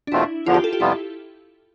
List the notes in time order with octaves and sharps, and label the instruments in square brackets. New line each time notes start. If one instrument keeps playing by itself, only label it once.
[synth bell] D4
[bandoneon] E2 B2 A3 C4 F4 [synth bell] E4
[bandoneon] E2 D3 F3 [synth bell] F4
[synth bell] G4
A4
G4
[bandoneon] F2 C3 G3 B3 F4 [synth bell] E4